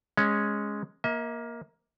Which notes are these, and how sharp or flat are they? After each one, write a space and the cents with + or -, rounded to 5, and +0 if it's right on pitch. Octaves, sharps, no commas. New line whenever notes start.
G#3 +0 C#4 +0 C#5 +0
A#3 +15 E5 -45